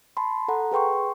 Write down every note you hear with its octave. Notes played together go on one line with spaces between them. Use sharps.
A5 B5 C6
A4 F#5 A#5
G#4 B4 G5 C6 C#6